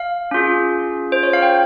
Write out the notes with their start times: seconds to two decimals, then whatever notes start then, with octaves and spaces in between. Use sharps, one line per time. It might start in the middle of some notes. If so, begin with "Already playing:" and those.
Already playing: F5
0.31 C#4 F4 G#4
1.12 C5
1.23 C#5
1.33 F5
1.42 G5